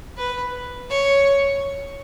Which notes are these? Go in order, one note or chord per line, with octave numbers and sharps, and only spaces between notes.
B4
C#5